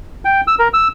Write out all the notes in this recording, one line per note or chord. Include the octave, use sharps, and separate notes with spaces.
G5
E6
A#4
E6